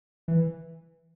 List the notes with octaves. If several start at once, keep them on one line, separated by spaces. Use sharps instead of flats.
E3